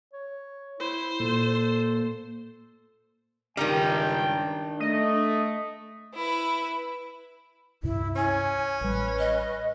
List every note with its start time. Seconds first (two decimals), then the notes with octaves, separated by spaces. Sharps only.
0.13 C#5
0.80 E4 C5
1.20 A#2 A4
3.57 C#2 G2 D#3 G3 D4 G5 A#5
4.80 A3 D#5
6.14 E4 B4
7.83 C#2 G2 C3 E4
8.16 C#4 G#5
8.81 A1 G3 B4
9.19 D#5